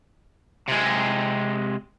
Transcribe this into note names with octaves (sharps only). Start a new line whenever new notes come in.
C3 G#3